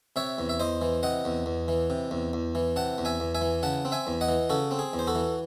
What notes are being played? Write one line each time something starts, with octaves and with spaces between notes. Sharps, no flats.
C3 C#5 E5
E2
E5
E2 C5 D#5
E3
C3 D#5 F#5
E2
E2
E3
C3
E2
E2
E3
C3 F#5 A5
E2
E5 G#5
E2
E5 G#5
E3
C#3 F#5 A5
C4
E5 G#5
E2
D#5 F#5
E3
C#3 F#4 A4
C4
G#4
E2
C5
F#4 A4
E3